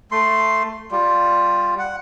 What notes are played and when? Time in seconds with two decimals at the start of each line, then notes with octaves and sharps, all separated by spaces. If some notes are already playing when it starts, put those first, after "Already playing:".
0.12 A3 C6
0.91 G3 F4
1.79 F#5